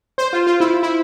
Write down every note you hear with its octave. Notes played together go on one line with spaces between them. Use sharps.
C5
F4
F4
E4
E4